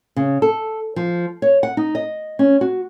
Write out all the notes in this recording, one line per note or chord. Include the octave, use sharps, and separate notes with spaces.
C#3
A4
F3
C#5
F#5
D#4
D#5
C#4
F#4